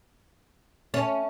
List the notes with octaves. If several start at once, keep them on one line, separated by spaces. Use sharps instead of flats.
A3 C#4 A5